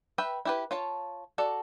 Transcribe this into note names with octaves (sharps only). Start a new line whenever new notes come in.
B4 E5 G5
E4 G4 B4
F4 C#5 A5
F#4 A4 D5